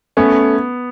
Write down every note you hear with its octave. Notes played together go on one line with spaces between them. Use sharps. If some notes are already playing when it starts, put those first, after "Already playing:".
A3 B3 C#4